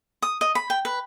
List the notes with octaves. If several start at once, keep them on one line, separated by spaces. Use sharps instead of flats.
D#6
D#5
B5
G5
B4